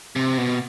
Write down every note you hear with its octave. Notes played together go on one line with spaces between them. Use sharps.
C3
B2